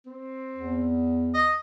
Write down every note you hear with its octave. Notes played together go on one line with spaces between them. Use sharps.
C4
E2
D#5